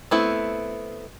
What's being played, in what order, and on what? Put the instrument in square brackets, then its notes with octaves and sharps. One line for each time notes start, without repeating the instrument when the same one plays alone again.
[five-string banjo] A3 B3 C4 E4